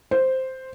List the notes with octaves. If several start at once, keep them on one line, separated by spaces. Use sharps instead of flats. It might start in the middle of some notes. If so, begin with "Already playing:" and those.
C5